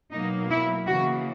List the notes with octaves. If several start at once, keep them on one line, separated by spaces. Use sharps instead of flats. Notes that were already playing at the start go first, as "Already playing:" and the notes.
B2 F#3 A#3 D#4
E4
C#3 E3 A#3 F#4